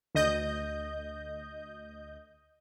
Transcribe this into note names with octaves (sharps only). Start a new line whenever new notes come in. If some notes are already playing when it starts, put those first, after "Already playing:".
D2 D#5 G6